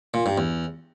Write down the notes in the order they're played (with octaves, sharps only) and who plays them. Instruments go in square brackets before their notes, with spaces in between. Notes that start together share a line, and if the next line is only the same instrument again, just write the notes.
[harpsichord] A#2
G2
E2